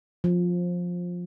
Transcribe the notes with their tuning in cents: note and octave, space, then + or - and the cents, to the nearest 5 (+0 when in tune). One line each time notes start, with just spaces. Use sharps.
F3 +15